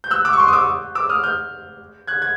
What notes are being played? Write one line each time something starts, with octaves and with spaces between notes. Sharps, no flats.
G6
E6 F#6
D6 E6
C#6
C6 D6
D#6
D6 E6
D6 E6
D#6 F6
F6 G6
F#6 G#6
G#6